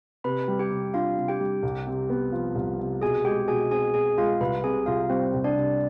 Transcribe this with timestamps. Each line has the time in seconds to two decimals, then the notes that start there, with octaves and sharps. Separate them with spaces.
0.24 C3 B4 B5
0.48 G3
0.59 G4 G5
0.71 C3
0.94 D4 F4 F5
1.18 C3
1.28 G4 G5
1.40 G3
1.63 C2
1.87 C3
2.10 B3
2.32 F3
2.55 C2
2.79 C3
3.02 B2 G#4 G#5
3.25 G#3 G4 G5
3.48 B2 G#4 G#5
3.71 C4 G#4 G#5
3.94 B2 G#4 G#5
4.18 G#3 F4 F5
4.40 C2 B4 B5
4.64 C3 G#4 G#5
4.86 C2 F4 F5
5.10 G3 C4 C5
5.34 C2
5.44 D4 D5
5.56 C3